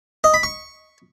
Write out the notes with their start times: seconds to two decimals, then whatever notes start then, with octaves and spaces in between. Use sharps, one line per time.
0.24 D#5
0.34 B5
0.43 C#6